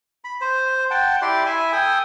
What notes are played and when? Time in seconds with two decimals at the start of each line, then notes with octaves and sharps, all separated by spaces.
0.24 B5
0.41 C5
0.91 F#5 G5 A5
1.22 E4 G4 D5 C6
1.46 E4 E5 G#5
1.72 A4 G5 G#5 D#6